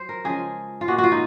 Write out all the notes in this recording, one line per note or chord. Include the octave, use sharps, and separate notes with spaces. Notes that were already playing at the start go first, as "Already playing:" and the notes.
Already playing: F#3 C5
A#4
C#3 F3 G#3 G#4
F4
A#2 G#3 F#4
F#4
F4
D#4